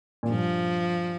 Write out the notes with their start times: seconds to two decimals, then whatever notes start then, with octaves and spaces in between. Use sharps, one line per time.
0.23 A#2
0.29 G2 F3